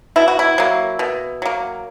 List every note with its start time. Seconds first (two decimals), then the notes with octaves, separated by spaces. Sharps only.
0.16 B2 E4
0.28 F#4
0.39 E4
0.58 F#3 A#3
0.99 B2
1.42 F#3 A#3